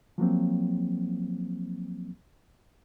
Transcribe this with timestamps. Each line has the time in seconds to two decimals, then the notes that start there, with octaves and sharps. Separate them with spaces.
0.18 F3 F#3 A#3 C4